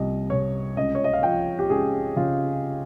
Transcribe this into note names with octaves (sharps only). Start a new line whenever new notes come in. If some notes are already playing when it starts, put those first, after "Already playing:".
Already playing: C2 F3 A#3 D#5
C3 C#5
C#2 D#5
C#5
D#5
F5
F3 G5
G4
C#2 G#4
C#3 F4